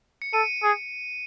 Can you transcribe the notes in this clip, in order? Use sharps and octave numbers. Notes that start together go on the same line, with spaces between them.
C#7
A4 D#7
G#4